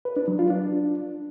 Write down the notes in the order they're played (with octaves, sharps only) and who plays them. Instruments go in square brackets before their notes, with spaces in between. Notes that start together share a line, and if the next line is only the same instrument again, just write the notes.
[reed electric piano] B4
D4
F#3
F4
D4